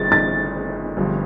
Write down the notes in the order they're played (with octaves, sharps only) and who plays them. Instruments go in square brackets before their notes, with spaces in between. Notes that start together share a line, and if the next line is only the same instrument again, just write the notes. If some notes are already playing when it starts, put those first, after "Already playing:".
Already playing: [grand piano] G1 G2 E3 [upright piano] A6
[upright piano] A6
[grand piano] G1 G2 F3